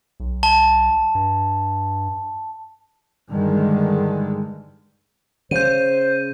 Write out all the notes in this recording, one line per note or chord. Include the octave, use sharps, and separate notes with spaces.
B1
A5
G2
G2 D3 D#3 G#3
C#3 C5 G6 D#7